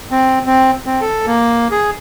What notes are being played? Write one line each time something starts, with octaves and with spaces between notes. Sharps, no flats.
C4
C4
C4
A4
A#3
G#4